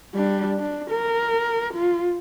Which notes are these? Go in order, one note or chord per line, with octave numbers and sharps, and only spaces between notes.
G3 D4
D4
A#4
F4